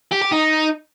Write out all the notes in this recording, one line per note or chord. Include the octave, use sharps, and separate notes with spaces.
G4
G4
D#4